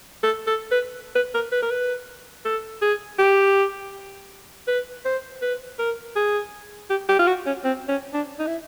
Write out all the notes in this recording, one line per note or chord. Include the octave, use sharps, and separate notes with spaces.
A4
A4
B4
B4
A#4
B4
A#4
B4
A4
G#4
G4
B4
C5
B4
A#4
G#4
G4
G4
F4
F#4
C#4
C4
C#4
D4
D#4
E4